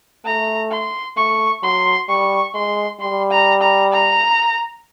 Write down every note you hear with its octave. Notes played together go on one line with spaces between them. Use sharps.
A3 A#5
C6
A3 C#6
F#3 C6
G3 C#6
G#3 C6
G3 C6
A#5
A#5
A#5